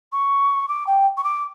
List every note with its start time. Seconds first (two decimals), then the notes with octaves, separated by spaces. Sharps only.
0.12 C#6
0.68 D6
0.87 G5
1.17 C#6
1.24 D6